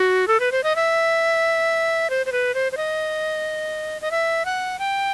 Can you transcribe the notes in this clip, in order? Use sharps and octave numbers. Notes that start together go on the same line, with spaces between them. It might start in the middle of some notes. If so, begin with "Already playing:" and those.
Already playing: F#4
A4
B4
C5
D#5
E5
C5
C5
B4
C5
C5
D#5
D#5
E5
F#5
G5